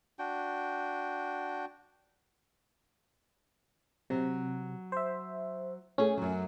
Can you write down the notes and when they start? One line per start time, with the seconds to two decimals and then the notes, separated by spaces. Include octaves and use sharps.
0.19 D4 F#4 G5
4.10 C3 F#3
4.92 C5 E5
5.98 A3 C#4 G#4
6.17 F#2 F#3